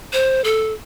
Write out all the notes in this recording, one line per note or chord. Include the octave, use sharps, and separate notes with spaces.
C5
A4